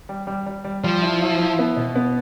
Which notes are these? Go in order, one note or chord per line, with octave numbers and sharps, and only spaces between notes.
G3
G3
G3
G3
F3 G3
E4
E4
E4
B3
B2
B3